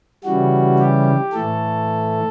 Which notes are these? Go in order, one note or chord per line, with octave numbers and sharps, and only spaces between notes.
C#3 E3 G3 F#4
G4
A2 E3 A3 A4